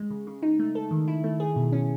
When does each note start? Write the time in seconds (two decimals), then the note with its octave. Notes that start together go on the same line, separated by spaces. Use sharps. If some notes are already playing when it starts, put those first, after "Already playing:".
Already playing: G#3
0.10 C#3
0.27 C#3
0.42 D#4
0.59 A3
0.75 A4
0.91 D#3
1.08 E4
1.24 A3
1.40 G#4
1.56 B2
1.72 C#4